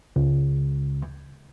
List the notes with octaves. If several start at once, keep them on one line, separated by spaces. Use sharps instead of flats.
C#2